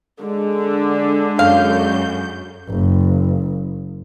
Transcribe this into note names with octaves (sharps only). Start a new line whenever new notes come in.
D3 G#3
F#2 F5 G6
F#1